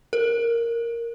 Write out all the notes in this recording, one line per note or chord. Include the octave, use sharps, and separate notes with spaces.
A#4